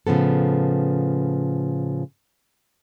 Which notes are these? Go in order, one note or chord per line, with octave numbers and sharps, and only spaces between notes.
A2 C#3 F3 B3 A4